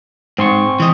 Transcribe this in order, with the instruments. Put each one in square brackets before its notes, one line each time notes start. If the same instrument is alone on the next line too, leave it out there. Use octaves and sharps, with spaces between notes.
[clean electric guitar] G#2 [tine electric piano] C4 C6 C#6
[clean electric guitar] E3 D#5